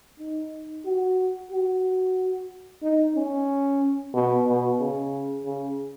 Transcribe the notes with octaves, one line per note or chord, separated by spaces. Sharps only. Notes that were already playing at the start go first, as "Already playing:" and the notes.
D#4
F#4
F#4
D#4
C#4
B2
B2
C#3
C#3